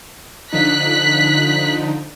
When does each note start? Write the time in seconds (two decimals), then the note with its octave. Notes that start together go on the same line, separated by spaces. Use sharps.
0.53 D3 F3 D#4 F#6 B6